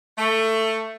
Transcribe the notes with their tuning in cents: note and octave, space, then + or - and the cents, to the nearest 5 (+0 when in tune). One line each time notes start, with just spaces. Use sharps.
A3 +15